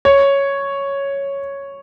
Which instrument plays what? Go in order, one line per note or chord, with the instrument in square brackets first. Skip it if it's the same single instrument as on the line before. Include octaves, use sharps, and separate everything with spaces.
[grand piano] C#5